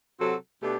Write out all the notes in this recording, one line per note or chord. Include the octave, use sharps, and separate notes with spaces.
C3 F#3 C4 F#4 A4
B2 A3 D4 G4